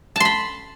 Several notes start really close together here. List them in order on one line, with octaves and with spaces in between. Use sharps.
A5 C6 B5